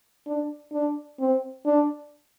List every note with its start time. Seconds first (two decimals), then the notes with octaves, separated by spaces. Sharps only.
0.27 D4
0.73 D4
1.19 C4
1.65 D4